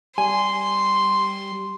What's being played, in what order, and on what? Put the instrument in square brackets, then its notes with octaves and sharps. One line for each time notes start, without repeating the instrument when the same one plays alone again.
[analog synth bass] G3 [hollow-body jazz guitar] G#5 [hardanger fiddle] C6